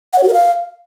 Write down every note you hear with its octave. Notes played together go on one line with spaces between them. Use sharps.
F#5
C#5
F#4
A#4
F5